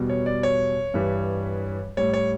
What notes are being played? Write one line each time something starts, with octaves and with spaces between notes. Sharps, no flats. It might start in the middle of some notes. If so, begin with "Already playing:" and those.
Already playing: E2 B2 G3
C#5
D5
C#5
G2 E3 G3
A2 G3 C#5
C#5